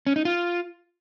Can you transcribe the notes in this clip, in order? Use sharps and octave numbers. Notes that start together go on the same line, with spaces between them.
C#4
D#4
F4